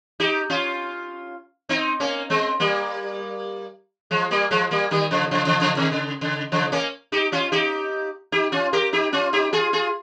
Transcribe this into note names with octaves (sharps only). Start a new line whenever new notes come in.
D#4 G4
C#4 F4
C4 D#4
A#3 C#4
G#3 C4
G3 A#3
F3 G#3
G3 A#3
F3 G#3
G3 A#3
D#3 G3
C#3 F3
C#3 F3
C#3 F3
C#3 F3
C3 D#3
C#3
C#3
C#3 F3
A#3 C#4
D#4 G4
C#4 F4
D#4 G4
D#4 G4
C#4 F4
G4 A#4
D#4 G4
C#4 F4
D#4 G4
F4 G#4
F4 G#4